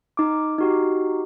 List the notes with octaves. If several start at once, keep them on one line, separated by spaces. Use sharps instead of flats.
D#4 D6
D#4 F#4 G4